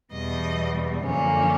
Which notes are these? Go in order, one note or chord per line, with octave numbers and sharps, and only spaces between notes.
E2 B2 G3 D#5
F#2 D3 F3 A#3 C#4